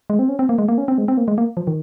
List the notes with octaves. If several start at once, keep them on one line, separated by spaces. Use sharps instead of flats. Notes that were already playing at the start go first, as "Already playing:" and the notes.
G#3
C4
C#4
C4
A#3
G#3
A#3
C#4
C4
G#3
C4
A#3
G#3
A#3
F3
D#3